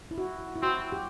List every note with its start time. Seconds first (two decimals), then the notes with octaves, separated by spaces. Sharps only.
0.11 E4
0.18 F#4
0.56 E4
0.62 C4 F#4
0.92 G4